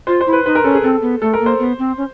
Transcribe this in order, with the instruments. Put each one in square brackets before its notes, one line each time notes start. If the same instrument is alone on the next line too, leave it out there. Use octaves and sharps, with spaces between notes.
[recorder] F4 [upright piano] C5
[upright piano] C5
[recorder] E4
[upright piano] B4
[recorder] D#4 [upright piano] B4
[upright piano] A#4
[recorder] C#4 [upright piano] A4
[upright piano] G#4
[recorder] C4 [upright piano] A4
[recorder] B3
[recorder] A3 [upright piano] A4
[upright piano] A#4
[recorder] A#3
[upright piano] C5
[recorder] B3
C4
C#4